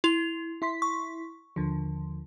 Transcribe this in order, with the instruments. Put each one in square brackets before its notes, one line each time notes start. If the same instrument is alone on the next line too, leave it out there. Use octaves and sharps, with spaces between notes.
[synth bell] E4 F7
[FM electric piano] E4 C6 B6
[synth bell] C#6
[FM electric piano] D#2 D3 F3